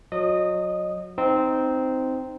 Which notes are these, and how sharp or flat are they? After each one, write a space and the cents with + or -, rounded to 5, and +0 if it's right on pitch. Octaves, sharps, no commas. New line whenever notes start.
F#3 -30 D#5 -25 D#6 +0
C4 -10 D#4 +0